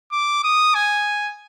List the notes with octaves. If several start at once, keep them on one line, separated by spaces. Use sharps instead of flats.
D6
D#6
G#5